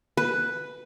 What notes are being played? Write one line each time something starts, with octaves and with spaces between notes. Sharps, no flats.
B4